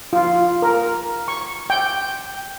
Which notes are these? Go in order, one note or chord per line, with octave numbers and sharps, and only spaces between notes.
F4
A#4
C#6
G5